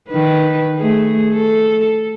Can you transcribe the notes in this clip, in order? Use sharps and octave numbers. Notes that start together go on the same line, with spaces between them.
D#3 B4
A3 G#4
A4